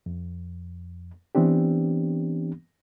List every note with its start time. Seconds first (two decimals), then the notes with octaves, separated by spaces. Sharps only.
0.06 F2
1.35 E3 B3 C4 D4 G4